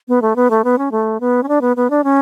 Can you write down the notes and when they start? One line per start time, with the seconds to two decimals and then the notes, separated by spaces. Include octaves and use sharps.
0.08 B3
0.22 A3
0.36 B3
0.50 A3
0.64 B3
0.78 C#4
0.91 A3
1.20 B3
1.43 C#4
1.48 D4
1.61 B3
1.76 B3
1.90 D4
2.04 C#4